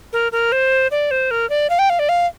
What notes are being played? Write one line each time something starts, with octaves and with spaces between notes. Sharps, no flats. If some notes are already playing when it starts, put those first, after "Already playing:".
A#4
A#4
C5
D5
C5
A#4
D5
F5
G5
F5
D5
F5